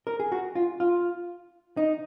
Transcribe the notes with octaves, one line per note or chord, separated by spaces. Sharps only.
A#4
G#4
F#4
F4
F4
D#4